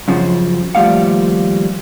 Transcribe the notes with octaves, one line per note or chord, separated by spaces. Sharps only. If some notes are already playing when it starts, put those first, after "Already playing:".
F#2 C#3 F3 F#4
D#2 F3 G3 A3 F5 F#5